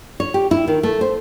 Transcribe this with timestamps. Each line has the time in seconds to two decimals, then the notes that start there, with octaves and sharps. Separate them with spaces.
0.20 C#5
0.34 G4
0.51 E4
0.68 D#3
0.83 A3
1.01 C5